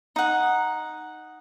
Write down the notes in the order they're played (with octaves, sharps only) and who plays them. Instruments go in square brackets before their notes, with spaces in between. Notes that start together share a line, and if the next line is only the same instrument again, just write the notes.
[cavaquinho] D#4 F#5